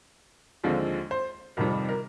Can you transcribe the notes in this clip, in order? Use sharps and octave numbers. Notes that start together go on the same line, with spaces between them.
D#2 D3 F3 G#3 C4
C5
F2 C3 D#3 G3 A#4
A#4